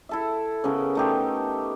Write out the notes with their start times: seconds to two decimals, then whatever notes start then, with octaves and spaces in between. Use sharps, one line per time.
0.09 E4 A4 E5
0.64 C#3 B3 C#4 A#4
0.95 A3 D#4 G4